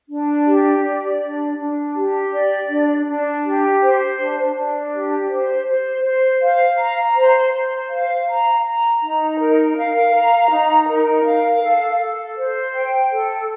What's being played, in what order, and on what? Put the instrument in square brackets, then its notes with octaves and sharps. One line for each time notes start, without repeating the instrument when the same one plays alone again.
[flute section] D4
G4
D5
D4
D4
G4
D5
D4
D4
G4
C5
D4
D4
G4
C5
C5
C5
F5
A#5
C5
C5
F5
A#5
A#5
D#4
A#4
F5
A#5
D#4
A#4
F5
A4
A4
C5
G5
A4